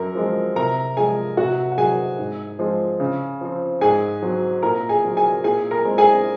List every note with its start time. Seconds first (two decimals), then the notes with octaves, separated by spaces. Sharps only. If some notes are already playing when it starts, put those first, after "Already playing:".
Already playing: F#2 A#4
0.15 F3 G#3 C4
0.56 C3 A#4 A#5
0.97 F3 G#3 G#4 G#5
1.37 C3 F#4 F#5
1.72 F#5
1.78 F#3 C4 G#4 G#5
2.19 G#2
2.59 F3 G#3 C4
3.00 C#3
3.41 F3 C4
3.81 G#2 G#4 G#5
4.22 F#3 C4
4.63 A#2 A#4 A#5
4.89 G#4 G#5
5.04 F#3 C4
5.17 G#4 G#5
5.44 A#2 G#4 G#5
5.71 A#4 A#5
5.85 G#3 C4
5.98 G#4 G#5